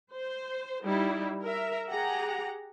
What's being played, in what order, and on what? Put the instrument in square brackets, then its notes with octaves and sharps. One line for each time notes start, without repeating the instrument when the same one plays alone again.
[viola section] C5
G3 D#4 E4
A#4 E5
G4 G#4 F#5 A#5